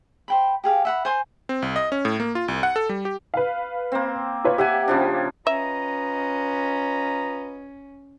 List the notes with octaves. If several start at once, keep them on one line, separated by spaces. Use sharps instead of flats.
C5 G5 B5
G4 G#4 F5
E5 F#5 B5
C5 G#5 C6
C4
C2
D#5
C#4
A2
A#3
F4
C2
F#5
A4
G3
G4
B4 F5
A#3 C4
F4 B4 C#5
G4 E5 F#5 G#5
C#3 F3 D4
C#4 F4 B4 D#5 E5 A#5